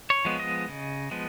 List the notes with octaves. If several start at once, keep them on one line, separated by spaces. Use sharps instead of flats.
C#5
F3 G#3 B3
D#5
C#3
F3 G#3 B3